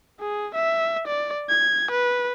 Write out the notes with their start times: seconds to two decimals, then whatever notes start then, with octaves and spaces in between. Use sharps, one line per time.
0.20 G#4
0.55 E5
1.07 D5
1.50 G#6
1.91 B4